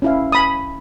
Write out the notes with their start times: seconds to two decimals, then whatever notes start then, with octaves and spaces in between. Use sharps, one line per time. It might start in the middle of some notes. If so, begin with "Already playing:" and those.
0.02 C#4 E4 F5
0.32 G#5 B5 D#6